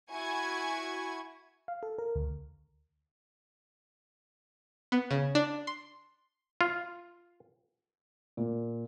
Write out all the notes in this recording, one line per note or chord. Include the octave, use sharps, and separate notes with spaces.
E4 F#4 G#5 C#6 G#6
F5
A4
A#4
D2
B3
C#3
D4
C6
F4
A#2